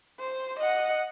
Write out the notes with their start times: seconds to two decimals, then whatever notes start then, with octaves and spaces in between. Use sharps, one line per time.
0.20 C5
0.59 D#5 F#5